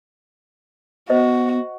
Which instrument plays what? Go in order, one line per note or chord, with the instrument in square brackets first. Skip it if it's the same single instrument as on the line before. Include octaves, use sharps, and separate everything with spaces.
[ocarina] B3 [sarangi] F#4 [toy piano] C5 D#5